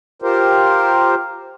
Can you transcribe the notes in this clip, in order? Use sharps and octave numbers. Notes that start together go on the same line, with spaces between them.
F4 G4 A#4 C5